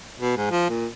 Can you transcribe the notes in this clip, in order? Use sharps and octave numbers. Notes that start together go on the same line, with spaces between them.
B2
G#2
F3
A#2